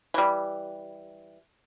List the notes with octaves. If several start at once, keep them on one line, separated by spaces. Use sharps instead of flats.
E3 G3